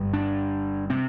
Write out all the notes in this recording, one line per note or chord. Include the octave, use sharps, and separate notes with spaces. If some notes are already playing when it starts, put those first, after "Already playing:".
Already playing: G1 G2
D4
C3 C4